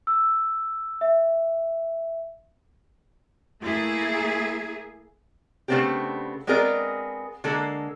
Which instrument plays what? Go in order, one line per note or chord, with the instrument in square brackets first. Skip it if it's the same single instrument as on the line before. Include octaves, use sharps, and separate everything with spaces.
[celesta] E6
E5
[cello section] A3 A#3 E4 G#4
[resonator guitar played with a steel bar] C#3 A3 B3 C4 D4 G4
G#3 B3 C4 G#4 A#4 D5
D3 G#3 A#3 A4